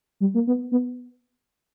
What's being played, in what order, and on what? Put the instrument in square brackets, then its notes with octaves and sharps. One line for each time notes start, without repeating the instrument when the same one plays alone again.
[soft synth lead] G3
A#3
B3
B3